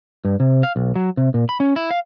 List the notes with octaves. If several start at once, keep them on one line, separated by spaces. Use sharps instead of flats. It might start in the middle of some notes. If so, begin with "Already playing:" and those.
G2
C3
F5
B1
F#3
C3
A#2
B5
C#4
E4
F5